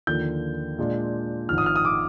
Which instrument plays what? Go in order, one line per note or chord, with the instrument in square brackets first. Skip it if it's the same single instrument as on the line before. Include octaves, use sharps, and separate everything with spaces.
[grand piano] D#2 D3 F3 A#3 G6
A#2 G#3 D4 F4
G#1 G#2 F3 F6
D#6
F6
D#6
D6